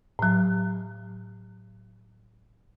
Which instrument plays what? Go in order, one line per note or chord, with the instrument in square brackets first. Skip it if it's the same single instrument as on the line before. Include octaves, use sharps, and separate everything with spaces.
[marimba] A2 F#3